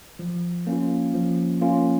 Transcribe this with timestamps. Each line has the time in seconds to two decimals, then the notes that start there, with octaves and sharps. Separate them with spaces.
0.19 F3
0.67 A#3 C#4 F4
1.14 F3
1.61 A#3 C#4 F4